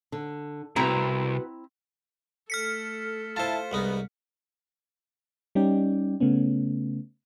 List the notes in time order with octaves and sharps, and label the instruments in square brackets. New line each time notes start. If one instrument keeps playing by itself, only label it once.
[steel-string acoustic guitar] D3
[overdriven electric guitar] C2 [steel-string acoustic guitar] B3 F#4 B4 [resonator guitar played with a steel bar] C4 E4 A#5
[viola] A3 A4 [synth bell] F6 B6 C#7
[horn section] E4 A5 [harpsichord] F4 C5
[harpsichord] C2 G#3 D#4 [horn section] B3
[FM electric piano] G3 C#4 D#4 D5 G5
C#3 A3 B3 C#4